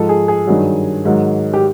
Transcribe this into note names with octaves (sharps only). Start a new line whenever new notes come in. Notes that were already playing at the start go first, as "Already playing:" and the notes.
Already playing: G#2 F3 A4
G#4
G#4
G2 D#3 F#3
G#2 D#3 F#3
G4